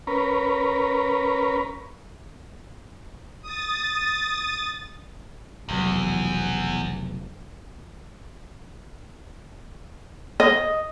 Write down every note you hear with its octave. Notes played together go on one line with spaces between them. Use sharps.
C#4 A#4 B4
D#6 A6
F1 B1 E2 F#3
D#5